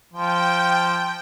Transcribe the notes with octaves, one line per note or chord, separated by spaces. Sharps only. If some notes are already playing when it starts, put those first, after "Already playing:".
F3 G5